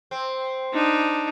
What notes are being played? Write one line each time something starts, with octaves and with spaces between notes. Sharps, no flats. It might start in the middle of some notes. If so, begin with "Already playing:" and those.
C4
D4 D#4